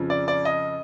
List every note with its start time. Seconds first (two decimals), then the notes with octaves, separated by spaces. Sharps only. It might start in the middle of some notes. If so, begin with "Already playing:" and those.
Already playing: F2 C#3 F3
0.10 D5
0.28 D5
0.45 D#5